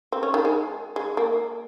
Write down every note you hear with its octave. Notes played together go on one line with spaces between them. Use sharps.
C4
C#4
D#3
G#3
G#3
A#3